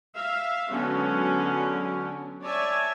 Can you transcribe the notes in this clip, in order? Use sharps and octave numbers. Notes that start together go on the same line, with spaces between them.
E5 F5
D3 F#3 G#3 B3 C#4
C#5 D5 E5 G#5 A5